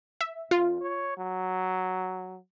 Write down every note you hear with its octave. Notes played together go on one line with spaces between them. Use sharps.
E5
F2 F4
C#5
F#3